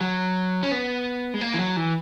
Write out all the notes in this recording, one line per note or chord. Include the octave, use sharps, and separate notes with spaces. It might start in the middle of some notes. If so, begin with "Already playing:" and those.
F#3
C#4
B3
G#3
A#3
E3
F#3
E3